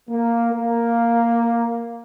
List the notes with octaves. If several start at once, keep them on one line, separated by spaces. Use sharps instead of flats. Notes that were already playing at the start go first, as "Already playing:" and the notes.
A#3
A#3